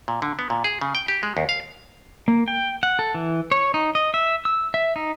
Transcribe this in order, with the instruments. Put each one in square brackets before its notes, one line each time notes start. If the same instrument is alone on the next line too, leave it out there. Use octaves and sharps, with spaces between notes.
[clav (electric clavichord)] A#2
D3
B3
A#2
G#4
C#3
G5
G4
G#3
D#2
F5
[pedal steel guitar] A#3
G5
F#5
A4
E3
C#5
D#4
D#5
E5
E6
E5
D#4